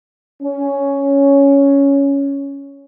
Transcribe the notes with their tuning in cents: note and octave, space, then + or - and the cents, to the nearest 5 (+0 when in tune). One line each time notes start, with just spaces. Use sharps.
C#4 +5